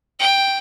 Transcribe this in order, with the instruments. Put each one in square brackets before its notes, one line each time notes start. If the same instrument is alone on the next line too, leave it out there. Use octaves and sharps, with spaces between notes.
[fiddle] G5